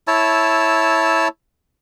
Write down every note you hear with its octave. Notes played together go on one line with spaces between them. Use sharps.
E4 C#5 A5 E6